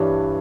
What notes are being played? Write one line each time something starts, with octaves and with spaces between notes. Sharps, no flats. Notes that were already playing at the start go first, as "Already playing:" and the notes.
Already playing: G2 E3 G3 D4 C#5